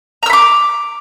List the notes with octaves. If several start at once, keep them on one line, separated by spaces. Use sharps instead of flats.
A#5 B5 D6 E6